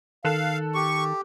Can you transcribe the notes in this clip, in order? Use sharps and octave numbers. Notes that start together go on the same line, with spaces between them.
D#3 A4 F5 F#6 E7
G4 C#6